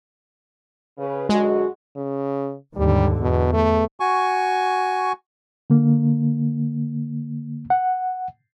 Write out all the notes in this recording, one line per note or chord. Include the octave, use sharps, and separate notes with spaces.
C#3 B4
F#2 D3 G#3 F#4
C#3
D#2 G#2 D3 G3
E2 B2
A3
F#4 G#5 C#6
D3 A#3
F#5